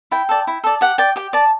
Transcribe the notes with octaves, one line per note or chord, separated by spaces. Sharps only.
E4 G5
A4 D5
E4
A4 D5
G4 F#5
D5 G5
G4 G5
D5 A5